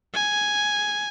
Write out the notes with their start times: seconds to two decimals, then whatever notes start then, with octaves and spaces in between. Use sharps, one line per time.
0.14 G#5